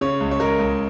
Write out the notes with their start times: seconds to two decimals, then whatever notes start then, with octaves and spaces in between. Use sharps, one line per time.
0.01 C#3 C#5
0.20 C#2
0.31 C#5
0.40 G#3 A#4
0.59 C#2